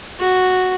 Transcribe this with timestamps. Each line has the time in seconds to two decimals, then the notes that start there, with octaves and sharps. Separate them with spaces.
0.20 F#4